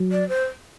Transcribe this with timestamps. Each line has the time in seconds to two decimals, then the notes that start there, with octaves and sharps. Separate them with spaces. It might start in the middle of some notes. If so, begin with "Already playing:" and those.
Already playing: F#3
0.12 D5
0.29 C5